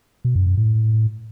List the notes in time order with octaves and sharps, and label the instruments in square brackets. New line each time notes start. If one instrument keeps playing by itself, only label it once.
[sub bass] B2
F#2
F#2
A2